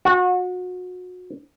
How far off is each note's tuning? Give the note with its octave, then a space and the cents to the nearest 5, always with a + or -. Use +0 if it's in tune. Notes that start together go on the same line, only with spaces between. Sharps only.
F#4 -30